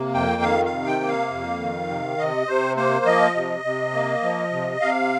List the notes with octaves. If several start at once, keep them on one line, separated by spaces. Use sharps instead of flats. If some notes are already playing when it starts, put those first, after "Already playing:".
Already playing: C3 A#3
F2 G5
D#3 F5
F5
C3
G5
A#3
F5
F2
D#3
C3
C3 D#5
C3 C5
A#3 C5
F3 D#5
C3
C3
A#3
F3
C3
C3 F5